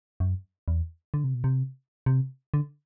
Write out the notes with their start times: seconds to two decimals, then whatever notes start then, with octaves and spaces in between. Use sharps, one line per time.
0.20 F#2
0.68 E2
1.14 D3
1.24 C3
1.34 B2
1.44 C3
2.06 C3
2.54 D3